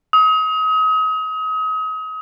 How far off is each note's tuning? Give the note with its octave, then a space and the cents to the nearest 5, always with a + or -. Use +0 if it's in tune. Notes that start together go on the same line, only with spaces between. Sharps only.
D#6 +35